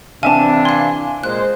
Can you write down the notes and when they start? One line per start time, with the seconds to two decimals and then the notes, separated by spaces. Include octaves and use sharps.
0.23 C3 E3 C4 D4 E5 F5 G#5 A5
0.65 F5 G#5 C6
1.24 A#2 G#3 C5 F#6